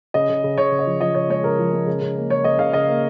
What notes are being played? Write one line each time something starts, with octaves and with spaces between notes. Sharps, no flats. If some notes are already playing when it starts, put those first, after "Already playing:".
C#3 D#5
C#3
C#3
C#3 C#5
C#3
D#5
F3
F3 D#5
C#3 C#5
G#3 C#5
C#3 A#4
F3
G#3
C#3
C#3
A#3
C#3 C#5
C#3 D#5
C#3 F5
C#3 D#5
A#3